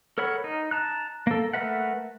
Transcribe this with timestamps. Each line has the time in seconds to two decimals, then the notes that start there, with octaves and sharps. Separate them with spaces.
0.18 A4 A#4 C#5 F#5 B5
0.44 D#4
0.71 A5 A#5 F#6
1.27 A#3 A4
1.53 A3 A#4 B4 E5 F#5